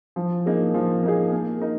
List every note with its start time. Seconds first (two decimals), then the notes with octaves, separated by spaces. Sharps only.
0.16 F3
0.46 A#3 D#4 G#4
0.74 F3
1.03 A#3 D#4 G#4
1.32 A#3
1.61 D#4 A#4